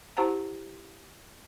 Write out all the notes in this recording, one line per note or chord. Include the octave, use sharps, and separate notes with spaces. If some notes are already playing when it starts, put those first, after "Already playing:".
E4 G4 C5 F#5 A5 A#5